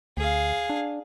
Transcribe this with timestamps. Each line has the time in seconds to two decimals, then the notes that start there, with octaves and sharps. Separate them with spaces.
0.17 D2 G#4 F5
0.70 D4